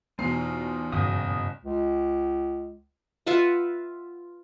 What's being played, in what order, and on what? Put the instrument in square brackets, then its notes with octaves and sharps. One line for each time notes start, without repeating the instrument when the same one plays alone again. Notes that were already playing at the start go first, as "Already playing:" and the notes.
[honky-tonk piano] E2 B2 [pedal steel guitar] C4 D#4 F4 [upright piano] C7
[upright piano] F#1 [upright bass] G2 A#2 [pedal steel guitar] D#5 G5 D#6
[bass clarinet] C#2
[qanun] F4 B4 E5 F#5